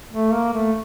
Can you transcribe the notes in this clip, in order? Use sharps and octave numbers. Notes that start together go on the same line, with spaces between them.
A3
A#3
A3